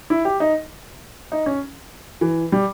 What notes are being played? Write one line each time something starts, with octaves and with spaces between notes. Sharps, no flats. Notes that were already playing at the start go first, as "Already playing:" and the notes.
E4
G4
D#4
D#4
C#4
E3
G3